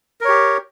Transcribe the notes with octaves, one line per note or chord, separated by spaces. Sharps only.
G4 A#4 C#5